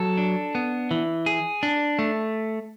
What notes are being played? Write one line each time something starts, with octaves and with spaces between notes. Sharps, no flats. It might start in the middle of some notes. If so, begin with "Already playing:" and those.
Already playing: F#3 A4
D4
B3
E3
G#4
D4
A3